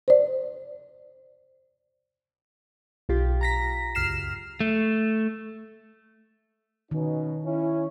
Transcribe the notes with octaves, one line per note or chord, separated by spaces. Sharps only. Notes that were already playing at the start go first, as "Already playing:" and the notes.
C5 D5
B1 F4 G4
A#5 A#6 B6
C#2 F#2 F6 C7 E7
A3
B2 D#3 C#4 D#4
C#4 E4